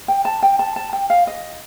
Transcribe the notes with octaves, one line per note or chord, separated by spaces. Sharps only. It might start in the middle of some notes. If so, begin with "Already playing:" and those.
G5
A5
G5
A5
A5
G5
F5
D#5